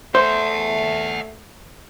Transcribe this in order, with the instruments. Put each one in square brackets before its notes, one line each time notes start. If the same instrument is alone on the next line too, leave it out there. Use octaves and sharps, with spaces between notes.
[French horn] A3 [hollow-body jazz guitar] C5 [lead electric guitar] E5 F#5